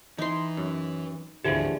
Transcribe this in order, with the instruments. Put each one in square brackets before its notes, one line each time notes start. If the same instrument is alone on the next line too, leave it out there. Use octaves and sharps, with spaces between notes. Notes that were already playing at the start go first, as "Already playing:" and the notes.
[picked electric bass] E3 [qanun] D#4 C6
[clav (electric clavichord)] F#2
[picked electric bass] G#1 D2 [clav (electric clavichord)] D3 E3 F3 [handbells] G4 G#4